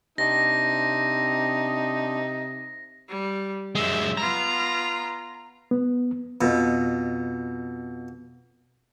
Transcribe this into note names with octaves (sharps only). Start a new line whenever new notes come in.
C3 C4 D4 D#4 A#6
G3
F#2 G#3 E5
B3 F4 A#5
B3
F2 B2